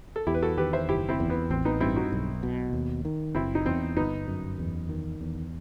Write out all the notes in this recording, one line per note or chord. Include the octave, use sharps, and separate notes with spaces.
A4
E2 E4 G4
B4
F#4 A4
D#3 G4 B4
C5 E5
F#1 E4 G4
C4 E4
E2
B3
A1 C4
B3 D#4
G2 C4 E4
D#4 F#4
B1
B2
D#2
D#3
F#1 C4 E4
D#4
E2 C4
G1 B3 D#4
F#2
E2
D#3
E2